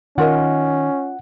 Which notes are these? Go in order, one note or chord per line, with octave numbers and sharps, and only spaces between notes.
D#3 C#4 F4 A#4 D#5 F#5